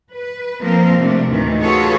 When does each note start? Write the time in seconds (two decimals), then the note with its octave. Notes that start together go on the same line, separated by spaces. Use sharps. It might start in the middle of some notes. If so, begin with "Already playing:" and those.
0.12 B4
0.61 F3 A#3 C4 A#4
0.99 C3 A3 D4
1.30 D2 A2 D#3 E3
1.61 F4 F#4 G#4 A4 B4 C#5